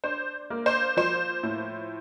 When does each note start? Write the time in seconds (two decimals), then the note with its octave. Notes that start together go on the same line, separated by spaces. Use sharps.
0.04 D4 C5
0.50 A#3
0.66 C5
0.97 F3 C5
1.43 A2